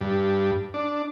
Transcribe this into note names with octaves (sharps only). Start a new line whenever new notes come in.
G2
D4